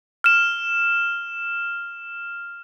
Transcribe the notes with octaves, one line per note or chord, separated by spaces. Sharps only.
F6 E7